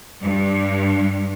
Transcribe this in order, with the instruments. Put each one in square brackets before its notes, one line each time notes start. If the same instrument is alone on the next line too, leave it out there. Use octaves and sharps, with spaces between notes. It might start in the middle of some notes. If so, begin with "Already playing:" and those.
[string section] G2